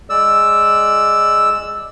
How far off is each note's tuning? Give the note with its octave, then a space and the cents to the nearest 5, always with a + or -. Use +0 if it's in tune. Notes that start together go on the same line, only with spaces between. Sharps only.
G#3 +0 D5 +10 E6 +0